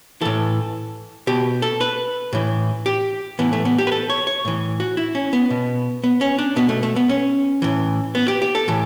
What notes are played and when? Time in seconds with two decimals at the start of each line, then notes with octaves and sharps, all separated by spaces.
0.21 A2 E3 A4
1.27 B2 G4
1.62 A4
1.81 B4
2.33 A2 E3
2.86 G4
3.39 A2 E3 B3
3.53 A3
3.65 B3
3.78 G4
3.87 B4
3.92 A4
4.10 C#5
4.27 C#5
4.45 A2 E3
4.80 F#4
4.97 E4
5.15 C#4
5.33 B3
5.50 B2
6.04 B3
6.21 C#4
6.39 D4
6.56 B2 B3
6.69 A3
6.83 A3
6.96 B3
7.09 C#4
7.62 A2 E3
8.15 B3
8.28 G4
8.42 G4
8.55 A4
8.68 A2 E3